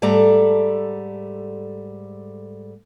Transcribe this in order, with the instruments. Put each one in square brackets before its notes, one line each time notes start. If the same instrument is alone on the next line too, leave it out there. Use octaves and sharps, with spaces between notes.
[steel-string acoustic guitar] G#2 G3 A3 A4 D5 A#5